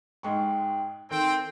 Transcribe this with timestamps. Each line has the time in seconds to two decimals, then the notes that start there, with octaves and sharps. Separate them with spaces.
0.23 G#2 G#3 G5 C#6
1.11 D#3 C4 A4 G5